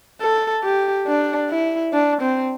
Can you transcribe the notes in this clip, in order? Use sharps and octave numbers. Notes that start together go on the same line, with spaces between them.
A4
G4
D4
E4
D4
C4